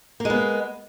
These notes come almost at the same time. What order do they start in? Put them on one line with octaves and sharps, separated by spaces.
A#3 G#3 B3